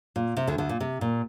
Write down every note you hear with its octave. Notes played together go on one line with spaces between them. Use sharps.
A#2
C3
D2 D3
D2 D3
A#2
C3
A#2